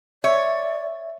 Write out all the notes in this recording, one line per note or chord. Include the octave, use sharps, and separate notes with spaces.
C#5 D5 E5